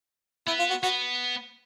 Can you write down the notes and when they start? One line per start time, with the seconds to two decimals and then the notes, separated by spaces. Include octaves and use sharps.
0.47 B3 E4
0.59 F4
0.70 F#4
0.83 B3 F#4